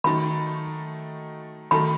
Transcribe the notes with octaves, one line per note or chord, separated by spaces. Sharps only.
D#3 F#3 A3 D#4 A4 B5
D#3 F#3 A3 D#4 A4 B5